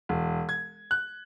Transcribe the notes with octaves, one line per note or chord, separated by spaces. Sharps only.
E1
G#6
F#6